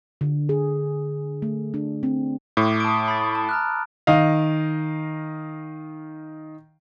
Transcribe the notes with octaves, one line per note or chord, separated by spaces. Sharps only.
D3
G#4
A3
D4
C4
A2 D6
A5 D#6 D7
B5 A6
A5
A#5 F6 F#6
D#3 D#5 F5